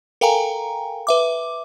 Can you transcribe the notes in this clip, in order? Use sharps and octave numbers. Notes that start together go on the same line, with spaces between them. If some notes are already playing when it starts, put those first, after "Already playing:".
A4 A#4 F5 G5 G#5 A#5
B4 E5 D6